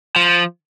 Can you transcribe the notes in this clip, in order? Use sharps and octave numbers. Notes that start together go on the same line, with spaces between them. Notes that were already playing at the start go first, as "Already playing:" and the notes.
F3